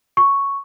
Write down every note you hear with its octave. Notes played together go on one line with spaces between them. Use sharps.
C#6